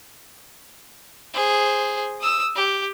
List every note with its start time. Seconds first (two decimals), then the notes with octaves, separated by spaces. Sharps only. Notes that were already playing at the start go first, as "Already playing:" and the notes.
1.34 G#4 C5
2.21 D#6 E6
2.55 G4